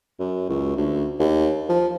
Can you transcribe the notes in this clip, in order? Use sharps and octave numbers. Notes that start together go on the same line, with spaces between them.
F#2
C#2
D2
D#2
F3